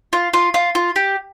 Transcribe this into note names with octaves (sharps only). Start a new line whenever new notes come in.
F4
F4
F4
F4
G4